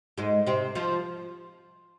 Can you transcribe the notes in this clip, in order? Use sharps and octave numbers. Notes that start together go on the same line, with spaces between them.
G#2 G#3
C3 C4
F3 F4